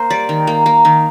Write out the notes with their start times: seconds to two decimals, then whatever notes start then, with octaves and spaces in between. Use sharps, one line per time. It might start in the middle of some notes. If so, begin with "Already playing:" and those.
Already playing: A#3 A#4 C5
0.10 G3 D5
0.29 D#3
0.47 A#3
0.66 A#3
0.85 D#3